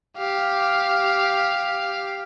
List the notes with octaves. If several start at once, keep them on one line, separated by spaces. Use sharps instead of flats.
G4 F5